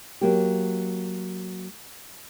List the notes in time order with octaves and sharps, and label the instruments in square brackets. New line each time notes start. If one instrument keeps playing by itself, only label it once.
[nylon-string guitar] F#3 A#3 G4